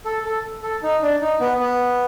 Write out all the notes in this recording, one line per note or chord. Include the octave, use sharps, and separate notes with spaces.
A4
A4
A4
D#4
D4
D#4
B3
B3